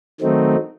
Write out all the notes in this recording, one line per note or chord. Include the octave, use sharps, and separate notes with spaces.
D#3 F#3 A3 C4 D#4